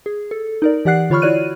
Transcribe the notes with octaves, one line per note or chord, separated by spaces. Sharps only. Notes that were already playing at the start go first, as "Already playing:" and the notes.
G#4
A4
D#4 A#4 D5
E3 G4 D5 F#5 F#6 C7
D3 F4 C#5 B5 C#6 F6
E4 F#4 C#5 D5 F#6 D#7